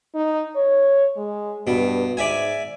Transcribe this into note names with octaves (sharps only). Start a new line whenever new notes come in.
D#4
C#5
G#3
G2 B2
G#2 D5 E5 G#5